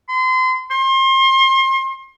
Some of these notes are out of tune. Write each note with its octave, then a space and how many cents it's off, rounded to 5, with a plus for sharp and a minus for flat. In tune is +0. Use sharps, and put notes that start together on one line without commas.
C6 -30
C6 +35